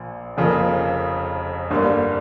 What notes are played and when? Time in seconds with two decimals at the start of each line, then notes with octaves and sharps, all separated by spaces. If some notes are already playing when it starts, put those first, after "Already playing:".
Already playing: A#1 A#2
0.37 F1 F2 C#3 F3 A#3
1.70 G1 G2 D3 G3 A#3